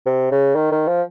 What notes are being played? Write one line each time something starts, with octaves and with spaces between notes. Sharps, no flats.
C3
C#3
D#3
D#3
F3